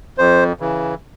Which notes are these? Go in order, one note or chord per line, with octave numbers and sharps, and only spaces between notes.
F2 C5
C#3 E3